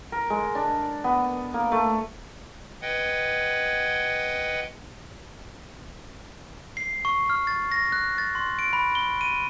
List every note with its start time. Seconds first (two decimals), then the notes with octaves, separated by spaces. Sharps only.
0.12 A#4
0.30 G#3
0.55 D4
1.04 B3
1.54 A#3
1.72 A3
2.82 B4 D#5 F#5 G5 G#6
6.77 C7
7.05 C#6
7.30 F6
7.47 A6
7.72 A#6
7.92 F#6
8.18 A6
8.35 C6
8.59 D7
8.73 B5
8.95 G7
9.21 D#7